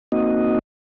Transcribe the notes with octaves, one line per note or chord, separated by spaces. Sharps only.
A#3 C4 D#4 F#4 D#5